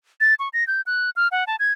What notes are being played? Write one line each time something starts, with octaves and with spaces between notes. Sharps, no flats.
A6
C#6
A#6
G6
F#6
F6
F#5
A5
G#6